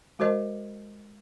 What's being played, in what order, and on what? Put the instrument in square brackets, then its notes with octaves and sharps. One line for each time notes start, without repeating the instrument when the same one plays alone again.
[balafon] G#3 F#4 A#4 C5 D#5